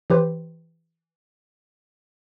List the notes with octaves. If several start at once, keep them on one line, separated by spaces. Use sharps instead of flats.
E3 G4 B4 C5